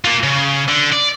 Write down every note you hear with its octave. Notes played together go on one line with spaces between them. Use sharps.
A#3 F4
C#3
D3
D5